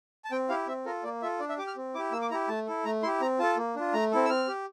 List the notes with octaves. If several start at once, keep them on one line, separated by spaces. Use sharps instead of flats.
A5
C4 G5
E4 G4 F5
C4 E5
F4 A4 A#4
A#3 D5
F4 A4 E5
D4 D5
E5
G4 D6
F6
C4
E4 G4 D6
A#3 E6
D6
E4 G4 A#5
A3 A5
E4 A4
A3 A#5
E4 G4 C6
C4 A#5
F4 A4 A5
A#3
D4 F4
A3 A#5
C4 E4 A4
E6
C4 F6
G4